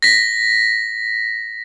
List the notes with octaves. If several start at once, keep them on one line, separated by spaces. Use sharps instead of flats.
A#6 B6